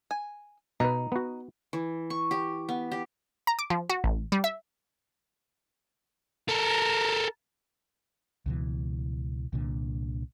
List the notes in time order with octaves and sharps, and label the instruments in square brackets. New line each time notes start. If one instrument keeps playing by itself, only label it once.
[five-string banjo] G#5
[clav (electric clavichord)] B2 B4 [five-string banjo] D#4
[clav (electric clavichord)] B3 F#4
[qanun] E3
C#6
G4
B3
G4
[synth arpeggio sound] A#5
D6
F3
F#4
A1
G3
E5
[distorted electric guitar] A4 A#4
[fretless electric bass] C#2 B2 E3
C2 A#2 D3